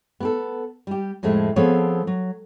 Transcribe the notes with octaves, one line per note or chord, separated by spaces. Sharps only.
B3 G4 A4
G3 G4
F2 A2 F3 G#3 A3
F3 B3 C4 G#4 A4 C#5
F#3